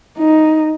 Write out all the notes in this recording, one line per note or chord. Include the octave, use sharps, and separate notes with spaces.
D#4